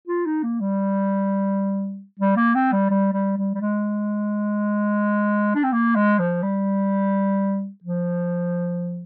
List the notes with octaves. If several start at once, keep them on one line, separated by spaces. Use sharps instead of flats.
F4
D#4
A#3
G3
G3
A#3
C4
G3
G3
G3
G3
G3
G#3
D4
C4
A#3
G#3
F3
G3
F3